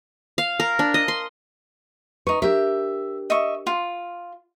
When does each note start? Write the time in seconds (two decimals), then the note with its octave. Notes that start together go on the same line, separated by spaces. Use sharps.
0.38 F5
0.60 A#4
0.79 D4
0.94 D#5
1.08 C6
2.27 D#4 B4 C#6
2.42 D4 G4 A#4 E5
3.30 D#5 E5 C#6
3.67 F4